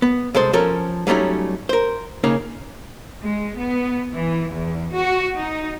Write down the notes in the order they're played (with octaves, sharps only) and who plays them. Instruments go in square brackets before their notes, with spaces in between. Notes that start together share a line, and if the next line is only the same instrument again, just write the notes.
[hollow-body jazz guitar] B3
C2 G#3 A4 C5
F3 C#4 A4 A#4
F#3 G3 A3 C#4 D#4
A#4 C5
C#3 A#3 C#4 D#4
[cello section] G#3
B3
E3
E2
F#4
D#4